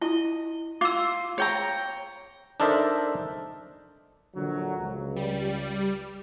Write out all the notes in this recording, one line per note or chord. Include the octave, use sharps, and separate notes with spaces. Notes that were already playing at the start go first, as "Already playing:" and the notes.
E4 D#5
F4 D6 E6
C#5 G5 A#5
D4 D#4 A4 A#4 C5 E5
A#1 D3 F#3
C#2
G3